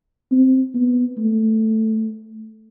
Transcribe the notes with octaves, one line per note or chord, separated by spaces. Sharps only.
C4
B3
A3